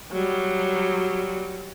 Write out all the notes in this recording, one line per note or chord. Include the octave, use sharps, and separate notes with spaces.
F#3 G3